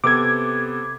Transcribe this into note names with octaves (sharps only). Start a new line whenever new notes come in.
C3 B3 A4 D6 G#6